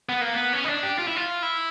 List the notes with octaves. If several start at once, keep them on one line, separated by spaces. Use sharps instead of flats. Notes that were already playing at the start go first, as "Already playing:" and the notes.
B3
A#3
B3
C#4
D#4
D4
G4
F4
E4
F4
E4